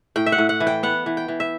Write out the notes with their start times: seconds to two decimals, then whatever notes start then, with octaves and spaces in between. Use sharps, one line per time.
0.16 A2 G5
0.26 E5
0.32 F#5
0.38 A2
0.49 F#5
0.60 E3
0.67 G5
0.83 B3 F#5
1.06 E3
1.17 G5
1.28 E3
1.40 E5